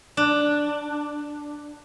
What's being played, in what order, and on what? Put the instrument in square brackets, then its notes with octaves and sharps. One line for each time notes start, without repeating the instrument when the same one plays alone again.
[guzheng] D4